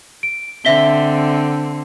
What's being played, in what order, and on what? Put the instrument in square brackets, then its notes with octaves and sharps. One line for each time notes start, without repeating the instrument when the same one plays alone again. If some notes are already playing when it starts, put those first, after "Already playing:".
[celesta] D7
[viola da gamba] D3 C4 [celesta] E5 B6 G7